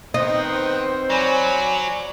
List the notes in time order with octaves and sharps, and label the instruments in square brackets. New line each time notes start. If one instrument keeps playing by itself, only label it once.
[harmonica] D#3 B3 [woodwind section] C4 C5 [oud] D#4
[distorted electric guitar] F#3 [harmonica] D5 G#5 B5